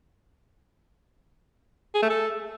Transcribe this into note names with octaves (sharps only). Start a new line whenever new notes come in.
G#4
A3
A4